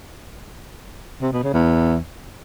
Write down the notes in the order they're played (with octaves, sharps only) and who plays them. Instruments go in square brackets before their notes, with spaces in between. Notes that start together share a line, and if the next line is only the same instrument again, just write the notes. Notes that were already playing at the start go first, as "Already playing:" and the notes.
[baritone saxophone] C3
B2
C#3
E2